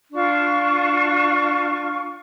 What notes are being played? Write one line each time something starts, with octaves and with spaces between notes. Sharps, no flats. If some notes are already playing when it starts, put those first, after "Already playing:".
D4 F4 C#6